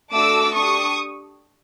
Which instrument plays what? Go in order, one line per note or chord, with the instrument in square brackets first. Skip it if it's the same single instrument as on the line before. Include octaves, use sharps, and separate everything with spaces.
[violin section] A3 D4 F#4 A4 D6 E6
D4 G4 C#6 D#6